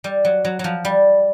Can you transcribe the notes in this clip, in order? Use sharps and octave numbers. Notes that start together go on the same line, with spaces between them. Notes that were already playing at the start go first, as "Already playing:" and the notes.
G3
F#3
F#3
F3 F#3
G3